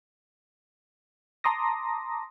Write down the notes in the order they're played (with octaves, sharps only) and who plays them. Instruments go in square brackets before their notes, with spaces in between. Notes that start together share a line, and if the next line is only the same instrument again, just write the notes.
[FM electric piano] A5 A#5 C6 D6 D#6 A#6